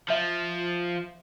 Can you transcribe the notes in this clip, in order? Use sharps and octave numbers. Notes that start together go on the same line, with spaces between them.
F3 E5